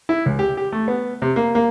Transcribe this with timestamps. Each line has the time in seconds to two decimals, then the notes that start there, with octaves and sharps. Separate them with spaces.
0.09 E4
0.26 C#2
0.39 G4
0.57 G4
0.72 A3
0.88 B3
1.22 C3
1.36 A#3
1.55 A#3